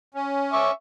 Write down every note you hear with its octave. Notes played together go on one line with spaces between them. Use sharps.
C#4
E5 C#6 D6